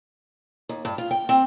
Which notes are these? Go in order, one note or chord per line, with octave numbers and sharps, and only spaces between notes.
D#2
G2
F4
G5
C4